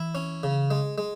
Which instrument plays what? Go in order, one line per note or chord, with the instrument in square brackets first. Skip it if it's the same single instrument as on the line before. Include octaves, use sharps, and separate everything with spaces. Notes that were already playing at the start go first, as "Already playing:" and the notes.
Already playing: [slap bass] E3 [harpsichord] E4
[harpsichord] C#4
C#3
G#3
G#3